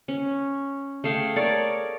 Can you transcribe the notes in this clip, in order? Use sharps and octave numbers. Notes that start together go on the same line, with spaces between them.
C#4
A3 G#4 F5 G5
A#4 C#5 D5